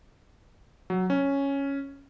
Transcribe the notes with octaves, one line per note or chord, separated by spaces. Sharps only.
F#3
C#4